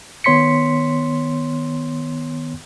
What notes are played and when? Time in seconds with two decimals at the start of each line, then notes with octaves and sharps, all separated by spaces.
0.24 D#3 B3 C#5 C6 B6 C#7